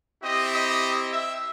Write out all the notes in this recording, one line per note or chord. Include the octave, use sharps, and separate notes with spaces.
C4 E4 G4 D#5
D#5
E5